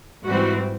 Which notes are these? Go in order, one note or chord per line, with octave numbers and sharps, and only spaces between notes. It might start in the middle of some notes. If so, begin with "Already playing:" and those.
G#2 E3 G3 C4 F#4